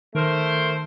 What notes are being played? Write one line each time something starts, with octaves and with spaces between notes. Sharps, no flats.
D#3 A3 A#4 C5